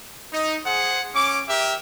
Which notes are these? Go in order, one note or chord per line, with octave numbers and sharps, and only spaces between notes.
D#4
G#4 C5 F#5
C#4 D6
G4 A#4 E5